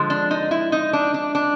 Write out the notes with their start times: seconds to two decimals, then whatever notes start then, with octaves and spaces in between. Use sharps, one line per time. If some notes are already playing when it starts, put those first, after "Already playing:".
Already playing: D3 F3 G#3
0.10 D4
0.31 D#4
0.51 E4
0.72 D#4
0.93 D4
1.14 D4
1.35 D4